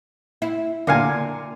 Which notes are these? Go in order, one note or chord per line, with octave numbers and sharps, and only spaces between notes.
E4
A#2 D3 A#4 F5 G#5